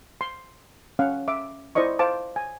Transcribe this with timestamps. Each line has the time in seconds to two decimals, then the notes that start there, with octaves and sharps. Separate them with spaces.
0.21 C6
0.99 C#4 F5 F#5
1.28 E5 D6
1.75 E4 C5 D5 D#5 C#6
1.99 C5 F5 A5 D6
2.36 G#5